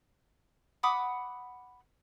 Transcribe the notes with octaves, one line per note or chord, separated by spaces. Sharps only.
F#5 B5 D6 D#6